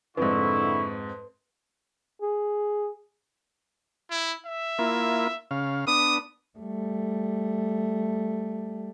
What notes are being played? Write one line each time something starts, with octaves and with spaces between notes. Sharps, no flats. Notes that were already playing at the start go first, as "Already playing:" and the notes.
F2 G#2 D3 E4 B4 C#6
G#4
E4
E5
A#3 E4 F4
C#3 F5
B3 D4 D#6
G3 A3